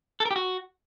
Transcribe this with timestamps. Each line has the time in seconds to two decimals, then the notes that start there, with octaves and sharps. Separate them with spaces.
0.20 A4
0.25 A#4
0.31 G4
0.36 F#4